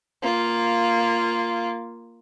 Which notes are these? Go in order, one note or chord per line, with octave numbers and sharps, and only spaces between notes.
A#3 F4